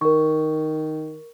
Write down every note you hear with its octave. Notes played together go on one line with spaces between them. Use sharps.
D#3 A#4 C#6